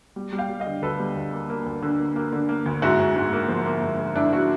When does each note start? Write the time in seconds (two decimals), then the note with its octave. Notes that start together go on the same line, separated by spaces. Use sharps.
0.16 G3
0.33 G3
0.38 F5 G5
0.49 G3
0.60 D#5 F5
0.66 D3
0.82 D2 A4 B4
0.99 G3
1.16 D2
1.33 A#3
1.50 A#3
1.66 D2
1.83 D3
1.99 A#3
2.16 A#3
2.33 D3
2.49 A#3
2.66 D2
2.82 G#2 E4 F#4
2.99 G#2
3.16 G#2
3.33 A#3
3.49 F3
3.66 A#3
3.83 G#2
3.99 G#2
4.16 G#2 D4 E4
4.32 F3 E4 F#4